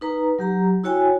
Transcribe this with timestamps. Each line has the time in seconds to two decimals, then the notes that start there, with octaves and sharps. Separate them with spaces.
0.01 D#4 B4 A#5
0.39 F#3 G4 A#5
0.84 E4 F#4 C#5 G5 G#5